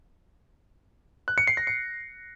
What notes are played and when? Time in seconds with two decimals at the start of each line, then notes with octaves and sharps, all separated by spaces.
1.28 F#6
1.38 C#7
1.47 C7
1.57 A#6
1.67 C#7